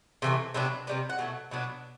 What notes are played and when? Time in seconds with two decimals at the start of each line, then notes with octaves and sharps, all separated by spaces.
0.22 C3 E3 A3
0.54 C3 F#3 B3 D4
0.87 C3 G3 B3 D4
1.10 F#5
1.19 B2 F#3 A3
1.51 B2 F#3 B3 D4